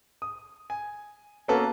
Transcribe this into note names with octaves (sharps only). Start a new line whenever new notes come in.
D#6
G#5
A#3 B3 C#4 F#4 A4 B4